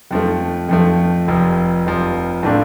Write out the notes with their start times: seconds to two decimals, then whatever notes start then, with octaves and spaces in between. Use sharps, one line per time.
0.11 F2 F3 A3
0.69 F2 F3 A3
1.28 F1 F2 F3
1.86 F1 F2 F3
2.43 A2 A3 D4 F4